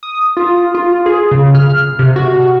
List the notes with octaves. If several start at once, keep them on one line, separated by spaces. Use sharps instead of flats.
D#6
F4
F4
G#4
C#3
F6
C3
F#4